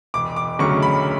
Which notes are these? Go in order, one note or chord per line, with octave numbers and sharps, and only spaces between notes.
E1 D6
D6
D2 C#3 F#3 C#6
B5